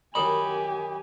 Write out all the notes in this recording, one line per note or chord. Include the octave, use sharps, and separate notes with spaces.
F#2 D#3 D#4 G4 G#5 B5